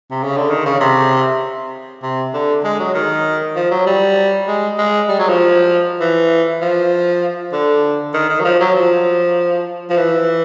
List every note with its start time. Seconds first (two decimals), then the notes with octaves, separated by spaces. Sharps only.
0.11 C3
0.23 C#3
0.37 D3
0.50 D#3
0.65 C#3
0.80 C3
2.03 C3
2.33 D3
2.64 G#3
2.79 F#3
2.94 D#3
3.56 F3
3.71 F#3
3.86 G3
4.47 G#3
4.78 G#3
5.09 G3
5.19 F#3
5.29 F3
6.00 E3
6.61 F3
7.53 D3
8.14 D#3
8.30 D#3
8.40 F#3
8.44 F3
8.60 F#3
8.75 F3
9.90 F3
9.97 E3